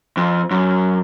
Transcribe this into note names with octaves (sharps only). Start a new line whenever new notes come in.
F2
F#2